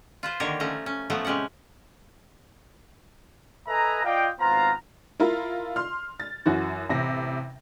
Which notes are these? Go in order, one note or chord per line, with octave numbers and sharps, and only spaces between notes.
F4 B4 C5
D3 D#3 A#3 G4 A#4 C#5
F3 A3 C#4 A#5
C#4
A2 F3 F#3 A3 B3
C3 G#3 C#4 G4 F#5
A4 B4 D#5 E5 G#5 A#5
F4 D5 D#5 F5 G5
G#1 B3 F4 C5 F5 A#5
E4 F4 A#4 F5
C6 F6
A6
F#2 E3 F#4
A1 C3 A#6